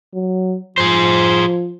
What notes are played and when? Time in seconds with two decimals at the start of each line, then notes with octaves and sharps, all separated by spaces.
0.14 F#3
0.78 F3 G#4 C5